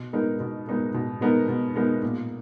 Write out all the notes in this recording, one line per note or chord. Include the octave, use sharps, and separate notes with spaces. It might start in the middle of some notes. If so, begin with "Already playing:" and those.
Already playing: B2
G#3 B3 D#4 A#4
B2
G#3 B3 D#4 A#4
B2
G#3 B3 D#4 A#4
B2
G#3 B3 D#4 A#4
A#2